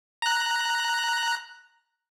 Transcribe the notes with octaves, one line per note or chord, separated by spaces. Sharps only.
A#5 F#6